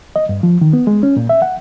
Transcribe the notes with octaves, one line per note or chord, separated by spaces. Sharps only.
D#5
G2
F3
D#3
B3
G#3
C#4
A#2
E5
F#5